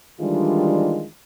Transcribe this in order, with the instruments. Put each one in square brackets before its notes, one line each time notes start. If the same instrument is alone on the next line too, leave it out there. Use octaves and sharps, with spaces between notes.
[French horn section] D#3 E3 G3 G#3 D4 F4